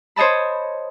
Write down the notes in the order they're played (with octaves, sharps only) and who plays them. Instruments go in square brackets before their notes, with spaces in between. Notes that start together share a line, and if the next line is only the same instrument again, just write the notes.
[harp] C5 C#5 D#5 A5 B5